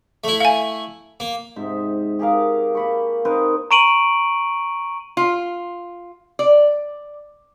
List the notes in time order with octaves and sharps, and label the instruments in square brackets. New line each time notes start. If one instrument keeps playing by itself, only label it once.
[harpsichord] A3 E4
[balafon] F5 G#5
[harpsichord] A#3
[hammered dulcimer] G#2 C3 E5
G4 G#4 A#4 F5
A#3 B5 C#6
C4 D#4 A#4 B4
[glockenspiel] A#5 C#6 D7 D#7 F#7
[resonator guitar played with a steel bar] F4
D5